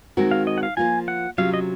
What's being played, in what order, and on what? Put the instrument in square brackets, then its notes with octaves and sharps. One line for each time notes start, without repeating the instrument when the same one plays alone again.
[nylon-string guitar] D#3 G#3 C4 F#4 A#4
[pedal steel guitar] F5
D#5
F#5
F5
[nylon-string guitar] F3 A#3 F4 [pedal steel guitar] G#5
[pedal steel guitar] F#5
[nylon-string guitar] C3 F#3 C#4 F4 [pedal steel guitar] F5
[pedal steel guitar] D#5